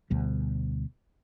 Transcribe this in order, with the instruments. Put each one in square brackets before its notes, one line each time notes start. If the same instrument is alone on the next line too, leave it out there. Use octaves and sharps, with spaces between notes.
[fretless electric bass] D2 B2 G3